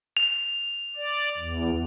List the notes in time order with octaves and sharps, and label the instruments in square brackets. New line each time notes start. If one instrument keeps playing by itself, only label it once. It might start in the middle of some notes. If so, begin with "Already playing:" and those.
[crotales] F7
[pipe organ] D5
E2